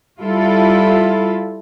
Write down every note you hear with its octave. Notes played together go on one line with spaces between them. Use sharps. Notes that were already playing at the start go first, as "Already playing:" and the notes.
G3 E4 F4 A4